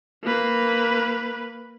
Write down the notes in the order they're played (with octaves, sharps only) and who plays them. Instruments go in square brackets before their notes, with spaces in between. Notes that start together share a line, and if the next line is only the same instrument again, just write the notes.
[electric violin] A#3 B4